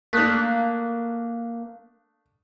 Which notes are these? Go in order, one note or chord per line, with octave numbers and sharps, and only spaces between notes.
A3 A#3 D4 D#6 F#6 B6